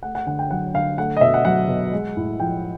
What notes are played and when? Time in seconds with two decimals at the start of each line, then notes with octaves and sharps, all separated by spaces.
0.03 A3 F#5
0.15 F#5
0.27 D3 F#5
0.39 G5
0.51 F#3 F#5
0.74 D3 F5
0.98 A3 F#5
1.17 D#5
1.21 B2 E5
1.34 F#5
1.45 F#3 F#5
1.69 B2
1.92 G#3
2.17 A2
2.40 F3 G5